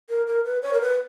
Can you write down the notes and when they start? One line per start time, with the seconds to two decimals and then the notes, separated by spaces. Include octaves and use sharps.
0.09 A#4
0.27 A#4
0.45 B4
0.62 C#5
0.73 A#4
0.81 B4